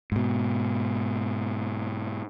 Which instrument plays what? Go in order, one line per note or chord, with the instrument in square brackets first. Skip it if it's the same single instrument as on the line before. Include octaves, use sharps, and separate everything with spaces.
[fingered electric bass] G#2 B2